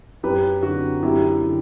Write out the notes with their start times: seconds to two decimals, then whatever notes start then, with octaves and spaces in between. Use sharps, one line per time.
0.23 F#2 G4 B4
0.62 D3 F#4
1.03 F#2 E4 G4
1.43 D3